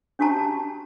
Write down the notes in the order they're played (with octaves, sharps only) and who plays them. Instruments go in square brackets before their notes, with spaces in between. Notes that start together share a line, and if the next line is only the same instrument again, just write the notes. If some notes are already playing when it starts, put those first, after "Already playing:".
[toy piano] C#4 D4 F#4 G4 A5 A#5